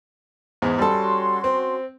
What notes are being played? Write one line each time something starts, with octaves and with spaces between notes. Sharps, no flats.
E2 G#2
G3 C#4 F#4 A4 C6
C4